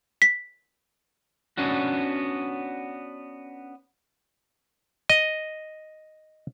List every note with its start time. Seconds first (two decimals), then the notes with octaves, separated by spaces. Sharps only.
0.22 B6
1.57 B3 C#4 D4 F#4
5.09 D#5